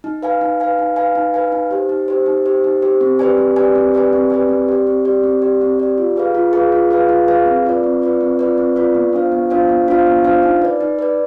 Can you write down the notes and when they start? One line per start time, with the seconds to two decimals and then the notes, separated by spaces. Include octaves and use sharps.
0.04 D#4
0.23 B4 F5 G#5
0.41 D#4
0.60 B4 F5 G#5
0.79 D#4
0.96 B4 F5 G#5
1.15 D#4
1.34 B4 F5 G#5
1.52 D#4
1.71 G4 C5
1.89 D#4
2.08 G4 C5
2.26 D#4
2.46 G4 C5
2.64 D#4
2.82 G4 C5
3.01 C4
3.19 G4 B4 D5 G#5
3.38 C4
3.56 G4 B4 D5 G#5
3.75 C4
3.94 G4 B4 D5 G#5
4.13 C4
4.30 G4 B4 D5 G#5
4.49 C4
4.68 G4 D5
4.87 C4
5.05 G4 D5
5.24 C4
5.42 G4 D5
5.61 C4
5.79 G4 D5
5.98 F4
6.16 G#4 B4 F5
6.35 F4
6.53 G#4 B4 F5
6.72 F4
6.91 G#4 B4 F5
7.09 F4
7.28 G#4 B4 F5
7.46 C4
7.65 F4 B4 D5
7.84 C4
8.02 F4 B4 D5
8.21 C4
8.39 F4 B4 D5
8.58 C4
8.76 F4 B4 D5
8.95 B3
9.13 D4 F4 C5 F5
9.32 B3
9.50 D4 F4 C5 F5
9.69 B3
9.88 D4 F4 C5 F5
10.06 B3
10.24 D4 F4 C5 F5
10.43 D#4
10.62 B4 D5
10.81 D#4
10.99 B4 D5